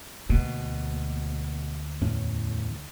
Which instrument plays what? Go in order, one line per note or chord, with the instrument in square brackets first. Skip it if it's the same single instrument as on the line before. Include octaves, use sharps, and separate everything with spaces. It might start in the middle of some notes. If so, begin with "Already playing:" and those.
[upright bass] D2 A#3 [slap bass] B2
[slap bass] E2 A2 C#4